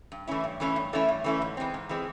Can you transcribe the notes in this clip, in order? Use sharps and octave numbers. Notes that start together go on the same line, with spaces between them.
G2
E3 A3 C#4 E4
G2
E3 A3 C#4 E4
G2
E3 A3 C#4 E4
G2
E3 A3 C#4 E4
G#2
E3 G#3 C4
G#2
E3 G#3 C4